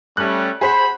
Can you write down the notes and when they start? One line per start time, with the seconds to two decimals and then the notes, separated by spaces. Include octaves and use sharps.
0.17 G3 A3 C#4 F#6
0.61 G#4 C5 F#5 B5